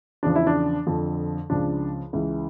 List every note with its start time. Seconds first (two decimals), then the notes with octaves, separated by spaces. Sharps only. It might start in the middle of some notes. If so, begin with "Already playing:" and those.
0.23 E2 C#3 F3 D4
0.36 E4
0.47 D4
0.87 F2 D3 F3
1.50 C#2 C#3 F3 D4
2.13 C#2 C#3 E3